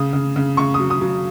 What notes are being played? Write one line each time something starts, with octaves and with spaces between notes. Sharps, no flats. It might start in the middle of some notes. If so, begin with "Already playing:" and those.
Already playing: C#3 D#6
C#3
C#3
C#3 C#6
D#6
F#3
D#6
F#3